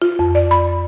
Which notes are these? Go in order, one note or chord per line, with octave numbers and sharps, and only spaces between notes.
F4
F2
D5
B5